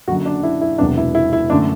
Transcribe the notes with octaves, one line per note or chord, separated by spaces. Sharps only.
F#1 F#2 D3 F#3 F#4
D4
E4
E4
E1 E2 C3 F#3 B3 D4
E4
E4
E4
F#2 D3 A3 D4